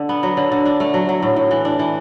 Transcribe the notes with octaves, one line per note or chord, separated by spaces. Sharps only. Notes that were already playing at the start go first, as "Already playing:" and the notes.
Already playing: D3 D4
B3
F#3
D3
D3
D4
A3
F#3
F#3
A2
A2
E3
D4
E3